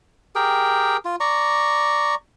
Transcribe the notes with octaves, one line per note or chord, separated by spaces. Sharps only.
G4 G#4 A#4 G5
F4
D5 A#5 C#6